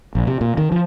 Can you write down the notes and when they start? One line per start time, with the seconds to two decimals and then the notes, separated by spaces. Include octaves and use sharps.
0.15 A#1
0.27 C3
0.41 A#2
0.57 D#3
0.72 F3